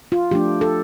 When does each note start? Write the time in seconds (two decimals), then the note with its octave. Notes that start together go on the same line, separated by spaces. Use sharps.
0.12 F4
0.31 F3 A3 D4 G4
0.61 A4